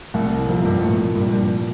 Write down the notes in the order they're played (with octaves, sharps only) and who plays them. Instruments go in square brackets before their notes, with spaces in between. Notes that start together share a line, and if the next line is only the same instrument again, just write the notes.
[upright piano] C2 [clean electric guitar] A2
[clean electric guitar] F2 [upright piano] A#2 F3 A#3
[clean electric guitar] G2
[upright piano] C2 [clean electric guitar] A2
[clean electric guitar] G2 [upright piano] A#2 F3 A#3
[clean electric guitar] G2